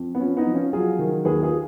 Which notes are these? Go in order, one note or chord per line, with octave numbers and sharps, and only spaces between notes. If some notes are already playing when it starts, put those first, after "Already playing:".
Already playing: F2
B3
F3 C#4
B3 D#4
F3
C#4 F4
F#3 F4 G#4
D#3
D#2 G#4 B4
F4 G#4